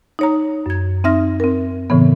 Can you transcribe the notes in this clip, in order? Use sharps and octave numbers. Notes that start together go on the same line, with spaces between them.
D#4 C#5 A#5
F#2 G#6
C4 D#4 E5 F6 A#6
C4 A#4
A2 C#3 E3 B3